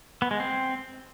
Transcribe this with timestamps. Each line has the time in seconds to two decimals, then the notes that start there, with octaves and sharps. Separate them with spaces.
0.22 B3
0.31 G#3
0.40 C4